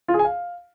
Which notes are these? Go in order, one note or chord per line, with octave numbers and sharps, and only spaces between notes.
F4
G#4
G#5
F5